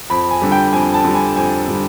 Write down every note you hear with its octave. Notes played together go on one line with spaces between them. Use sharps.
F2 B5
G#5
D3 G3
G5
F2 G#5
A5
D3 G3
G#5
F2 G#5
D3 G3